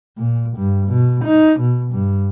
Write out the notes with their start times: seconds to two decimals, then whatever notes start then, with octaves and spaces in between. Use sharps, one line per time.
0.18 A#2
0.57 G2
0.89 B2
1.25 D#4
1.60 B2
1.92 G2